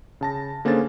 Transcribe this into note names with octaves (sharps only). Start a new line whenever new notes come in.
C#3 A5 A#6
D3 A#3 C#4 G#4 C5 A6